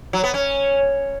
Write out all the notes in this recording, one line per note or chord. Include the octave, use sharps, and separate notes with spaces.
F#3
B3
C#4